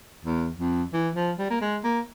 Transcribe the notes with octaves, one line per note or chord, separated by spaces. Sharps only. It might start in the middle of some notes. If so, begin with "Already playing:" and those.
E2
F2
E3
F3
G3
A#3
G#3
A#3